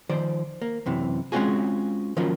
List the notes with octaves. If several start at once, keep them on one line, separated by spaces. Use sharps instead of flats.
D#3 F3 C5 D5
A#3
F#2 C3 E3
G#3 C4 C#4 F4 F#4 G#4
D#3 F3 F#3 A#3 C#4 F4